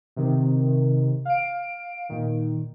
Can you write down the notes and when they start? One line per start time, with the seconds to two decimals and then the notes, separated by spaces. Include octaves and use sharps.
0.16 C3 D#3
1.25 F5 D7
2.09 A#2 D#3